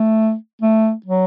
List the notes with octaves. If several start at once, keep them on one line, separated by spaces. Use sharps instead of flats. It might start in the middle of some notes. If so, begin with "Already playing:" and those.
Already playing: A3
A3
F#3